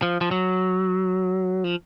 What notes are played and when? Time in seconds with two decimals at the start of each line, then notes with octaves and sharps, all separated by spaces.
0.02 F3
0.21 F3
0.31 F#3
1.64 F3